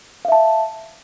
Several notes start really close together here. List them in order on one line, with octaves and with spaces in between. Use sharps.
F5 E5 A5